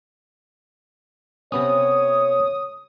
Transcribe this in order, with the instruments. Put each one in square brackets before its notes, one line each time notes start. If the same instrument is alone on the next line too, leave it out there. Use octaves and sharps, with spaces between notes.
[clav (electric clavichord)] C3 B3 C#4 [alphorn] C#5 [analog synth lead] D#6